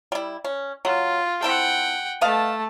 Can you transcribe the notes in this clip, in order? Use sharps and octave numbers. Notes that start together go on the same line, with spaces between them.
G3 E4
C#4
F#3 F4
C4 E4 A4 F#5 G5
A3 B4 D#5 F5 A5